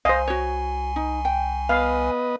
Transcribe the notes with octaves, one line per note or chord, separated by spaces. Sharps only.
C2 C5 D#5 F5 G#5
F#4 C#5
D#4
G5
B3 B4 D#5 F5